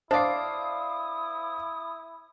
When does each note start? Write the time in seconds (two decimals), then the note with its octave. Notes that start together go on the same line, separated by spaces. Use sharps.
0.11 D4 E4 C5 D5 F5 D#6 C7